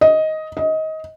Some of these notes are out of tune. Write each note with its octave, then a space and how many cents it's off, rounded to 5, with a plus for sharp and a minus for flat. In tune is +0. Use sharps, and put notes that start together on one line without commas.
D#5 +10
D#5 +20